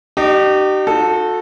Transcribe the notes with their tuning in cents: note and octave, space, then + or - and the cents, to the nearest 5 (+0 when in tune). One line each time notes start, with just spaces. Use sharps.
D#4 -45 G4 -30 D#5 +5
D#4 -10 F#4 -35 A4 +0